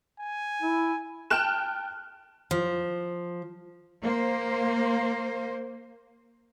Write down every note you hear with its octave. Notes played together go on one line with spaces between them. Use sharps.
G#5
E4
G5 A5 F6 F#6 E7
F3
A#3 C5